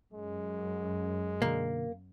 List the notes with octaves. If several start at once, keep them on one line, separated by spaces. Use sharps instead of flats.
F#2 G#3
B2 D3 A#3